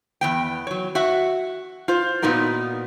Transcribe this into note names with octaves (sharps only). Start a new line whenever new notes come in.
E2 B3 G5
F#3 C#5
F#4 E5 F#5
F4 C5
A#2 B3 D#4 F#4 A#4